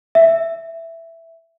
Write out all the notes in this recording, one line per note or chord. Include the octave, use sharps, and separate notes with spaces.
E5